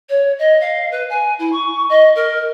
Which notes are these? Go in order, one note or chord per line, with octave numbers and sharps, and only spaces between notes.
C#5
D#5
F5
B4
G#5
E4
C#6
D#5
A#4